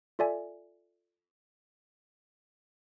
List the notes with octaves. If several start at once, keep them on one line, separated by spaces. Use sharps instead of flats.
F4 A4 D5 E5 G#5